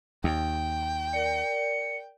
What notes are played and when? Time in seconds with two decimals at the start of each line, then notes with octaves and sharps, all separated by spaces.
0.24 D#2 G5
1.13 A#4 D5 C#7